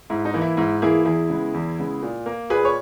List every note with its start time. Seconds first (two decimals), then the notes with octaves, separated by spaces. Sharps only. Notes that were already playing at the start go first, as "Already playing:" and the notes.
0.10 G#2 E4
0.25 D#4
0.34 E3 A#3
0.41 E4
0.57 G#2 E4
0.82 E3 A#3 E4 G#4
1.05 E2 E4 G#4
1.30 C#3 G#3 B3
1.54 E2
1.78 C#3 G#3 B3
2.02 A#2
2.26 A#3
2.50 A#2 G#4 B4
2.65 C#5